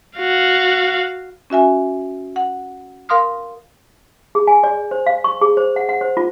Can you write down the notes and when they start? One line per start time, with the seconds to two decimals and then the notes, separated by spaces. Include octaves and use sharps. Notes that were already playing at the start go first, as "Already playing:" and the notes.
0.18 F#4 F5
1.50 C#4 F#4 E5 G#5
2.36 F#5
3.09 A#4 F5 C6 D#6 F6
4.35 G#4
4.47 G#5
4.63 D5
4.91 C5
5.07 F5
5.24 C#6
5.41 G#4
5.57 C5
5.76 F#5
5.89 F#5
6.01 C5
6.17 F4